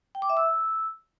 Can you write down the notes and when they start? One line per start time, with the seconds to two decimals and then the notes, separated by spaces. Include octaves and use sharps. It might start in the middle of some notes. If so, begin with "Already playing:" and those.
0.15 G5
0.22 D6
0.29 E5
0.37 E6